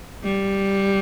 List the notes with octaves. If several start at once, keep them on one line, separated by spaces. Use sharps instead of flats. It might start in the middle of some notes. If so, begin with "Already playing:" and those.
G3